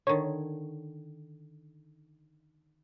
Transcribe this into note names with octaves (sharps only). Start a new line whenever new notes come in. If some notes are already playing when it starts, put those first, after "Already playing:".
D3 D#3 C#5